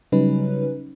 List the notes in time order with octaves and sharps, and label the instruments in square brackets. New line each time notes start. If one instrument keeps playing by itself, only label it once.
[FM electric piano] C#3 F#3 G3 C#4 D#4 B4